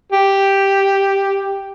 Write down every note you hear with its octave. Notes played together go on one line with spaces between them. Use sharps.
G4